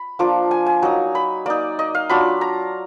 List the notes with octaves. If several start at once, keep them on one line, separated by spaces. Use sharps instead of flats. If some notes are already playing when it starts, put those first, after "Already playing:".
Already playing: B5
F3 A#3 D4 F4 D6
G#5
G#5
F#3 A#3 D#4 A#5
B5
A#3 D#4 D5
D#5
F5
F#3 D4 F4 B5
A#5